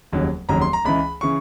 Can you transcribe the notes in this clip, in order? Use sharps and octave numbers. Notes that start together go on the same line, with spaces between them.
F1 D#2 C#3 F#3
F1 D#2 C#3 F#3 A#5
C6
A#5
C#2 C#3 E3 B5
C#3 E3 C#6